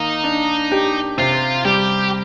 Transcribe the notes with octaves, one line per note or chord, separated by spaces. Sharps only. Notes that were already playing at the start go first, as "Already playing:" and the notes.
Already playing: D#3 A#3 D#4
D4
G4
C3 F4
G3 G4